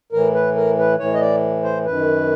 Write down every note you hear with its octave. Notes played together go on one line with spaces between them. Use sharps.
A2 E3 A#4
B4
A#4
B4
A2 E3 C#5
D#5
D5
C5
F#2 D#3 B4